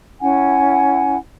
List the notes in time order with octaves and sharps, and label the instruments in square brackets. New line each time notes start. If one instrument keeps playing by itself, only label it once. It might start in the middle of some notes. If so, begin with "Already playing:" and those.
[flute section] C#4 E4 F#5 G#5